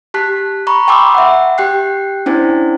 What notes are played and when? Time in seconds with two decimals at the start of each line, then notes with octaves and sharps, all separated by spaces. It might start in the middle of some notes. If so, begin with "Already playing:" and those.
0.14 G4 A5 F#6 B6
0.67 A#5 B5 C#6
0.88 G5 A5 B5 C6 D6 E6
1.14 E5 F#5
1.58 G4 G5 F#6 C7
2.26 C#4 D4 E4 C5